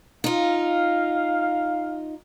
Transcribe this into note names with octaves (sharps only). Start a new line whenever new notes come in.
D#4 F4 F5